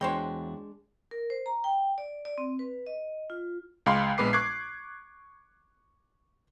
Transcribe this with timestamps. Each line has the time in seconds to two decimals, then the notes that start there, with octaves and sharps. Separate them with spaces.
0.01 E2 G#3 D4 F#4 C5 C#5 G5
1.11 A#4
1.30 C5
1.46 A#5
1.64 G5
1.98 D5
2.25 D5
2.38 C4
2.59 B4
2.87 D#5
3.30 F4
3.86 C#2 G#3 F5 B5 C6
4.18 A#1 G#3 B3 B4 D6 C7
4.33 C#6 D6 F#6 G#6 C7